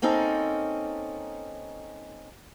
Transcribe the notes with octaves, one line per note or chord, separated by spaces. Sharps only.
A#3 C4 C#4 D#4 A4